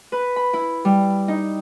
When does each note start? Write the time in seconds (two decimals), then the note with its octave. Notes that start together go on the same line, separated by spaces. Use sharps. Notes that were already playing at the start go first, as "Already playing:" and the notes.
0.12 B4
0.36 B5
0.53 E4
0.85 G3
1.28 D#4